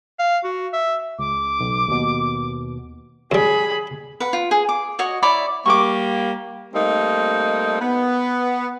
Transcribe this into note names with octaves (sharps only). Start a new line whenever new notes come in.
F5
F#4
E5
C#2 D6
B1
D#2 B2
F#2 G3 G#4 B5
B4 F#5
F4
G#4
D6
F#4 C#5 D#5
E4 C#5 D5 B5
G3 A#3 C#6 D6
G3 A3 A#3 C4 D#4
B3